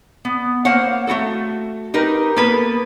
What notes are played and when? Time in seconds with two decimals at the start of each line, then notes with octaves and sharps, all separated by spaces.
0.25 B3
0.65 A#3 C5 C#5 F5 F#5
1.07 A3 F4 F#4 A4
1.94 D#4 G4 A#4 B4
2.36 A#3 B3 A4 B4